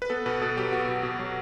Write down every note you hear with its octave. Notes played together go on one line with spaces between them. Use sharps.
B4
B3 A4
B2 B4
B2 A4
F#3 G4
B3 F#4
B2
B2
F#3